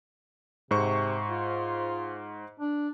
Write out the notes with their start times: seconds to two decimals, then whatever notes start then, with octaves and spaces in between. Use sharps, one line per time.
0.71 G#2 C3 C5 C#6
1.28 F4
2.60 D4